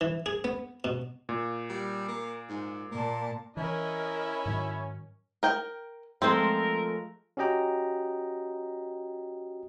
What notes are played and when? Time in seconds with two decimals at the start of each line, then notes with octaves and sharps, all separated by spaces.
0.01 E3
0.26 G#4
0.44 B3
0.84 B2
1.29 A#2
1.69 G3
2.08 A#3
2.49 G#2
2.92 A#2 A#3 A5
3.57 E3 C#4 E4 A#4 D#5
4.46 G#2 D#3 F#3
5.43 A#4 G5
6.22 F3 G#3 A3 C4 A#4 C5
7.37 C#4 F#4 G4 D#5 G5 A#5